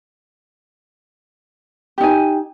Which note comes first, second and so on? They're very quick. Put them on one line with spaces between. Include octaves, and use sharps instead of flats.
G4 D#4 G#5